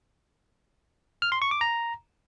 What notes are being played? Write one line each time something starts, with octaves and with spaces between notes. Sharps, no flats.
F6
C6
C#6
D6
A#5